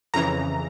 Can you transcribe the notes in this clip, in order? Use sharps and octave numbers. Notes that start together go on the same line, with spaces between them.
F2 C#3 E3 A#5